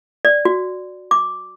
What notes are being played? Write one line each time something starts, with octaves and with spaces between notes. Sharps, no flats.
D5
F#4
D6